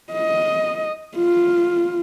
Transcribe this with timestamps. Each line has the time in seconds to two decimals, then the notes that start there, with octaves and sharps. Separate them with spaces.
0.13 D#5
1.16 F4